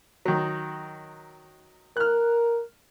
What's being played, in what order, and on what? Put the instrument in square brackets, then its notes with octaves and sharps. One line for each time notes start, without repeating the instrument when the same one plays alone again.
[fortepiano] D#3 F#3
[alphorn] A#4 [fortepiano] F6 F#6